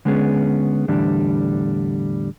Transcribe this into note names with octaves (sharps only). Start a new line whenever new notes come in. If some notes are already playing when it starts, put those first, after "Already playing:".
D3 G#3 B3 C#4 G#4
E2 A2 D3 G3 D4